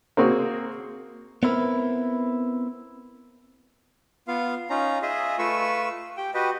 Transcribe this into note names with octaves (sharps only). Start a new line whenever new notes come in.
A#3 C4 F#4 G#4
B3 C4 E4 A#4 B4
B3 F4 F5
C#4 D#4 F4 A#5
F4 G#4 D#5 E5
A3 F4 B4 C#6 E6
G4 G5
F#4 G4 B4 D#5